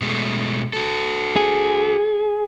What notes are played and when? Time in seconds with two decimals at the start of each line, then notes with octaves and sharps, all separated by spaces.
0.01 B2 G#3 A3
0.73 F#4 A4
1.36 G#4